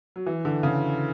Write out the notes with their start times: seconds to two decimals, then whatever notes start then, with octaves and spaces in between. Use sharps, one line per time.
0.16 F#3
0.26 E3
0.45 D3
0.63 C#3